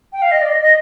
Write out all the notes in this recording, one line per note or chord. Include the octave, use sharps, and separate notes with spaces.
G5
F5
D#5
D5
D#5
D#5